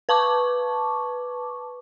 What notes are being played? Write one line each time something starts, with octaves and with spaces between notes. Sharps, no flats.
B4 A5 C#6 D6